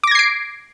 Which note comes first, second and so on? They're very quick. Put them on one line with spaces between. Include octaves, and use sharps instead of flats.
D6 A#6 G#6 C7 D7